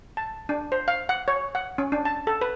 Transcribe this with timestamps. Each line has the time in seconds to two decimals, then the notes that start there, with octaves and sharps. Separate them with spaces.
0.17 A5
0.49 D4
0.72 C5
0.88 F5
1.09 F#5
1.28 C#5
1.55 F#5
1.78 C#4
1.92 D4
2.05 A5
2.27 A4
2.41 B4